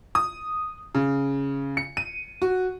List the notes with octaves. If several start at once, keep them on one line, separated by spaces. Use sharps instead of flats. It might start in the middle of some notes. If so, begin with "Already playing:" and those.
D#6
C#3
C#7
D#7
F#4